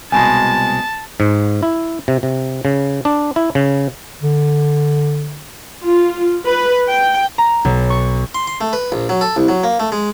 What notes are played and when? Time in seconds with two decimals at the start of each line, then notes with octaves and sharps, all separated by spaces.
0.12 C2 B2 G#3 G#5 A5
1.20 G#2
1.63 E4
2.08 C3
2.23 C3
2.65 C#3
3.05 D4
3.36 E4
3.55 C#3
4.22 D3
5.83 F4
6.46 B4
6.89 G5
7.38 A#5
7.65 B1
7.90 C#6
8.35 C6
8.47 C6
8.61 A3
8.73 B4
8.92 A#1
9.09 F#3
9.21 A4
9.36 C2
9.48 F#3
9.63 A#3
9.80 A3
9.92 G#3